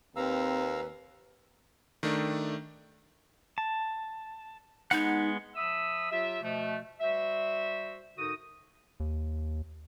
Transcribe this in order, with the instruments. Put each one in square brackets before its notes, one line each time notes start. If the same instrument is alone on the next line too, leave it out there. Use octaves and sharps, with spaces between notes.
[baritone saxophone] D#2 [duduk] C4 [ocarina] B4 [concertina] F5 A#5 E6
[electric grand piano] D#3 A3 D4
[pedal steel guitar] A5
[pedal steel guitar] G#3 B3 F#5 [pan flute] D#4
[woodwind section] F3 E5 B5 D#6 E6
F#3 F4 G4 E5
B2 F3 A3
G3 F#4 C5 E5
G#2 D3 D#4 F#4 A#4 D#6
[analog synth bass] D#2